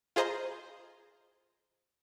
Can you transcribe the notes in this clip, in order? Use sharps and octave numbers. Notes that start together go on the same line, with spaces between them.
F4 G#4 C5 D#5 A#5 C6